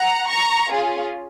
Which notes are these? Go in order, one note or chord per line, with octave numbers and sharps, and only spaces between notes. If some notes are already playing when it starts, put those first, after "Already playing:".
Already playing: F#5 A#5
A#5 C#6
C#4 F4 G#4